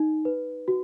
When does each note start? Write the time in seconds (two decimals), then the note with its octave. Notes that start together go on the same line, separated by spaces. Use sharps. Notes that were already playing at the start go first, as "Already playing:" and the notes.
Already playing: D#4
0.25 B4
0.68 F#4